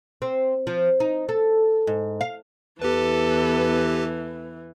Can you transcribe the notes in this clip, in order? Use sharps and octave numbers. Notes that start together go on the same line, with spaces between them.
C4
F3
D#4
A4
G#2
F5
E2 E3 B3 G4 A4 B4